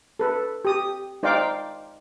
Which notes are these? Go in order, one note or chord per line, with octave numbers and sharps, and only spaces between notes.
A4 B4
G4 D#6
D#4 C5 D5 F5 G5 D6